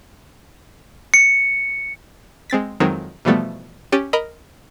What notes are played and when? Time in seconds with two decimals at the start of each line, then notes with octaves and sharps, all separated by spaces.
1.14 C#7
2.50 G#3 C4 A6 B6
2.80 F2 D#3 F#3 G#3 C4
3.25 B2 E3 F3 G3 A3 B3
3.92 C#4 G4 A6 C#7 D#7
4.13 A#4 D#5 A#5 B5